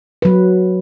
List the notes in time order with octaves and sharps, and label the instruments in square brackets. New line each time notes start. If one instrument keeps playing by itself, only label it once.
[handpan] F#3 B4